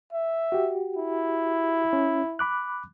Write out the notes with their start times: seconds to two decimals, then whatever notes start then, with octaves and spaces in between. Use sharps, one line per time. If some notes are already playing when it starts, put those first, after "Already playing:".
0.12 E5
0.52 F#4 G4
0.96 E4
1.93 C#4
2.39 B5 D6 F#6